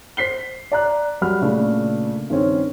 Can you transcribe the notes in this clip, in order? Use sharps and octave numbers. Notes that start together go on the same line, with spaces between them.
C5 B6 C7 G7
D5 A#5 F#6
F#3 G3 F#5 B5 F6
A#2 C#3 A3 D4
G2 D#3 C4 C#4